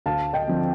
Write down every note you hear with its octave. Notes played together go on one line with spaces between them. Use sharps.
D2 F5 A5
D#5 G5
D3 F3 C4